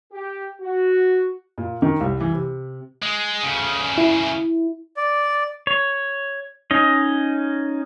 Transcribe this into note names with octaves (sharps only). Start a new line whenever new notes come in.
G4
F#4
A#2
D#3
C2
E3
C3
G#3
D2 C#3
E4
D5
C#5
C#4 D#4 D#5